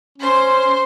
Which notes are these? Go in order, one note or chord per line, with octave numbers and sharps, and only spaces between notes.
C#4 C5 C6